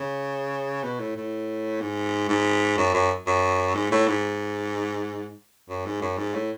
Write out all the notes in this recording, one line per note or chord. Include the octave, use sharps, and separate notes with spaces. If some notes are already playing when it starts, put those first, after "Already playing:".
Already playing: C#3
B2
A2
A2
G#2
G#2
F#2
F#2
F#2
G#2
A2
G#2
F#2
G#2
F#2
G#2
A2